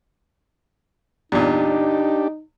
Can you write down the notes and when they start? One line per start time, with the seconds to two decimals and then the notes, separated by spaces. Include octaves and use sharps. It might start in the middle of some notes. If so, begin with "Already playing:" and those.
1.32 E2 A#2 D4 D#4 G4